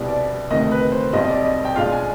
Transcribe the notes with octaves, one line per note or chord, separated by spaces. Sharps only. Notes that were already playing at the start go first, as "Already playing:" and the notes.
Already playing: C2 B2 G3 B3 D4
D5
D2 C3 D#3 D#5
B4
C5
B1 B2 G3 C4 D#5
D#5
D5
D#5
G5
B1 B2 G#3 D4 F4 F5
G#5